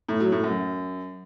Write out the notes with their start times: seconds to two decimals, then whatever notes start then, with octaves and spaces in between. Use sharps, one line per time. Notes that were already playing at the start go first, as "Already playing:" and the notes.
0.08 A2
0.20 F#3
0.32 A2
0.44 F#2